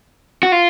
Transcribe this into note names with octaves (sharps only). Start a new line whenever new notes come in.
F#4
F4